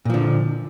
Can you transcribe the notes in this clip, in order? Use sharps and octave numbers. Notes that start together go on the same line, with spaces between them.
A#2 D3 F3